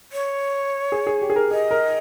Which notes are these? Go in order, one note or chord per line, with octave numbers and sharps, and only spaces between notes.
C#5
G#4
G#4
G4
G#4
A#4
G#4 D#5
A#4